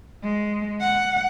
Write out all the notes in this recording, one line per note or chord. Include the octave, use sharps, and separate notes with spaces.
G#3
F#5